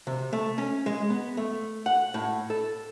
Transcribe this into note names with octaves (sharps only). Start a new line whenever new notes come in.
C3
A3
C#4
G#3
B3
A3
F#5
A2
A4